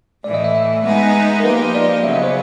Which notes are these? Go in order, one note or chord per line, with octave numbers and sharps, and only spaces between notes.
A2 E3 A3 D5
D#5
E5
E5
G#3 B3 D#4 G#4
A#4
F3 A#3 D#4 G4 B4
D5
C#3 F#3 B3 E5
D#5
C5